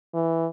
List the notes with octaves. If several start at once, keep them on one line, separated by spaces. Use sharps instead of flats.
E3